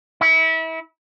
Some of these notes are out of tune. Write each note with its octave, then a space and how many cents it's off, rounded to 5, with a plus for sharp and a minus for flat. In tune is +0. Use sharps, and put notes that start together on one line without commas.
E4 -30